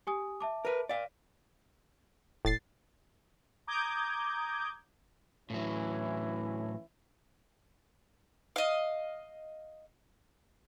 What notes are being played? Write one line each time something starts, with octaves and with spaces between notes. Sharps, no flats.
G4 G#5 D#6
E5 A5 D6
A#4 B4
D5 F5
E1 A2 A6 C7
A#5 D6 D#6 G6 G#6
A2 E3 F#3 C#4 E4
D#5 F5